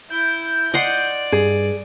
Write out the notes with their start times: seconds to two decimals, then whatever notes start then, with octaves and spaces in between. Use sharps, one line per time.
0.10 E4 G6
0.74 D5 D#5 F#5 C6
1.32 G2 G#4